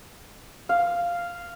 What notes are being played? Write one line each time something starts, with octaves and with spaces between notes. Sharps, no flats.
F5